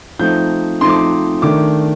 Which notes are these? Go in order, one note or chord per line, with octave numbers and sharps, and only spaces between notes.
F3 A3 C4 D#4 G6
F3 A3 C4 D#4 C6
D6
C6
D#3 A3 D4 D6